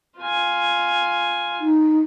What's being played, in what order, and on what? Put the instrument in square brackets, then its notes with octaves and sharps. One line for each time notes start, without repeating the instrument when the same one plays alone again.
[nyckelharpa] F4 G#5
[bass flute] D#4